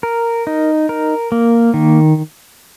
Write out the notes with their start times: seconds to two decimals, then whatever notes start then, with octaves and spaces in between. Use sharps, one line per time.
0.03 A#4
0.47 D#4
0.89 A#4
1.32 A#3
1.74 D#3